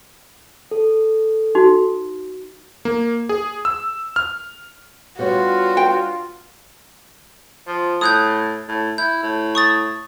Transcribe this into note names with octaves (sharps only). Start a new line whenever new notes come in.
A4
D#4 F#4
A#3
G#4
E6
F6
G2 G3 B3 F4 F#4 C#5
G5
F3
A2 D#6 F#6 G6
A2
E4 G6
A2
C#6 D#6 A6